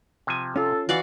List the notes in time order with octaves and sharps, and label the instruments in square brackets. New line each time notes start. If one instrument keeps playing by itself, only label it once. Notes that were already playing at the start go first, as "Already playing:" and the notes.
[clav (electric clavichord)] C3 F3 G#5
[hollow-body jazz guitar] C#4 F4 [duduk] A4
[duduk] E3 [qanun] F#4 D5 F5